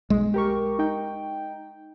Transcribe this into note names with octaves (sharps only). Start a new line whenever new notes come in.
B1 G#3
G4 A#4 C#6
D#4 G5